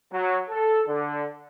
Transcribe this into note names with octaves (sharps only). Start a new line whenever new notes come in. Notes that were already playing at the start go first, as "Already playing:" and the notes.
F#3
A4
D3